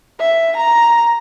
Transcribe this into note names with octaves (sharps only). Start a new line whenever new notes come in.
E5
A#5